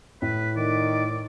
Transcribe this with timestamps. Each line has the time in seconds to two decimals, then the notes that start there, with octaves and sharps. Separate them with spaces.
0.22 A2 B4
0.57 D#3 D5